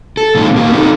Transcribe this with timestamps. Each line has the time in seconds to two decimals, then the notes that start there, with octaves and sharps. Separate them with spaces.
0.17 A4
0.35 A#2 D#3 G#3 B3 C4 F4
0.56 A#3 G4 A#4
0.72 C4 D#4 F4 G#4 A4 B4